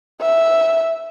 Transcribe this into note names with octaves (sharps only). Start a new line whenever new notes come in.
E5